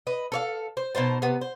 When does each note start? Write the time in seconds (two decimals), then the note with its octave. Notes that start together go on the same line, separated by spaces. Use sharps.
0.07 B4 D#5
0.32 A4 C#5 F5
0.77 C5
0.95 B2 D#4 C5 A5
1.22 C3 B3
1.41 C5